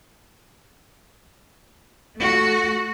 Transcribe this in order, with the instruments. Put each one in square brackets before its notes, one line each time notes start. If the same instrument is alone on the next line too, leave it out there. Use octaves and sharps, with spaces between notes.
[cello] A3 F#4